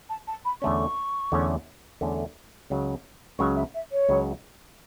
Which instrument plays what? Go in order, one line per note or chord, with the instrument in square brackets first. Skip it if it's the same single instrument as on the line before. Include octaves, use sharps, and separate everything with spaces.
[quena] A5
A5
B5
[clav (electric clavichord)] E2 D3 A3 C#4 [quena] C#6
[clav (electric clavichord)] E2 D3 A3 C#4
E2 D3 A3 C#4
C#2 C#3 F#3
[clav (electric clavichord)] C#2 C#3 F#3 [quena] C#6
[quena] E5
E5
C#5
[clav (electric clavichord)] C#2 C#3 F#3